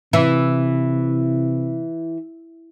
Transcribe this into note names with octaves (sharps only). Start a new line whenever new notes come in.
C3 E3